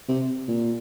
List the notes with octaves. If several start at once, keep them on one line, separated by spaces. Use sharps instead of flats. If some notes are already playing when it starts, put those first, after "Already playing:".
C3
A#2